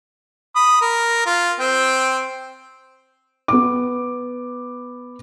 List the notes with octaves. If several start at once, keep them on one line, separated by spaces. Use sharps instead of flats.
B5 D#6
A#4
F4
C4 G5
B3 D6